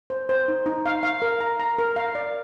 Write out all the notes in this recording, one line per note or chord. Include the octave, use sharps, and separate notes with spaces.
C5
C5
D#4
D#4
F5
F5
A#4
A#5
A#5
A#4
F5
D5